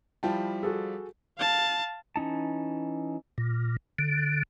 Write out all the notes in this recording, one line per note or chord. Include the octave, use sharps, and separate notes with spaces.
F3 G3 E4 F4 G5 A5
F#4 G#4 A4
F5 A5
E3 C#4 D#4 A5
A#2
D3